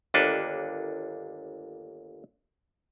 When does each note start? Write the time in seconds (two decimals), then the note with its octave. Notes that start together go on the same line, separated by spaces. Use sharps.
0.14 G1 D#2 A#3 D4 A4 B4